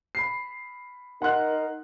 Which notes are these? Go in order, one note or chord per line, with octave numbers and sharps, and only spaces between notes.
B5 C7
D#4 A#4 F#5 C6 F#6